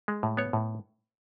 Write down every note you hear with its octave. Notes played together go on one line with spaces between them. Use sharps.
G#3
A2
B3 C#5
A2